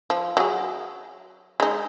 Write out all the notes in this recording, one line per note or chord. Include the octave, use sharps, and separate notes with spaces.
F3
F#3 G#4
G#3 D#4